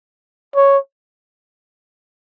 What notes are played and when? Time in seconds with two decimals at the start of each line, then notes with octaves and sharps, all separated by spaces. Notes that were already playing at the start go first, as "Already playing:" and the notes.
0.55 C#5